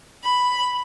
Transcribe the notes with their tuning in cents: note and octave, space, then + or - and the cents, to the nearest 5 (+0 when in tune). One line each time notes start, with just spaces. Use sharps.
B5 +5